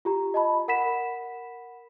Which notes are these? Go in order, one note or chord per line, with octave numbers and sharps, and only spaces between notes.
F4 G4 A#5
D#5 A5 B5
A#4 F#5 B5 B6 E7